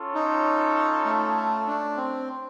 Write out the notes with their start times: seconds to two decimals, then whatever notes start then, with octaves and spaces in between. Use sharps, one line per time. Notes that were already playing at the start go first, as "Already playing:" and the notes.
Already playing: C#4 F4 A4 C#5
0.15 D#4
1.06 A3
1.67 D4
1.97 C4